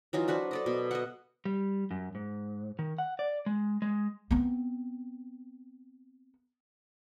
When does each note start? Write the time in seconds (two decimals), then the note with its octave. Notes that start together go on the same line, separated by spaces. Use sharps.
0.13 E3 F#3 D#4 F4
0.28 D4 F#4 B4 C5
0.51 A4 D5 D#5
0.66 B2
0.91 D#5 E5 F#5
1.45 G3
1.91 F#2
2.15 G#2
2.79 D#3
2.98 F#5
3.19 D5
3.46 G#3
3.82 G#3
4.31 B3 C4